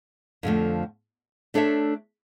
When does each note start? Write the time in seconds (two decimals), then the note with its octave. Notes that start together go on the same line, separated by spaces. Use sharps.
0.43 F2 D3 F3 A3
1.54 A3 D4 A4 C#5 E5